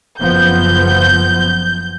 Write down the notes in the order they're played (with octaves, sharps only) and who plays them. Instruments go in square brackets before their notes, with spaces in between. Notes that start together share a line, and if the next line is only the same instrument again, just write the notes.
[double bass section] F#1 F3 B3 [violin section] G6